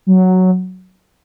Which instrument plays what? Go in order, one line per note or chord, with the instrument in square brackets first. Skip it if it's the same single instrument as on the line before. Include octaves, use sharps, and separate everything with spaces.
[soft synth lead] F#3